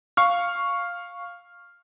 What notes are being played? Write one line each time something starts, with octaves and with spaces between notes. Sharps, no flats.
F5 C#6 F6